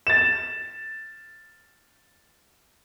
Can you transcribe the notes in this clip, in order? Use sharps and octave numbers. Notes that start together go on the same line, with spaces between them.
A6 E7